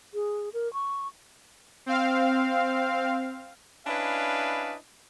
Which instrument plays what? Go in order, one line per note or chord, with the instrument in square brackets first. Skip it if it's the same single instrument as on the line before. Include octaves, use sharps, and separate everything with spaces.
[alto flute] G#4
A#4
C#6
[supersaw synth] C4 F5
[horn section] C#4 D4 E4 B4 D#5 F5